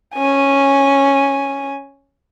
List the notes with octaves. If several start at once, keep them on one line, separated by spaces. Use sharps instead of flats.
C#4 G#5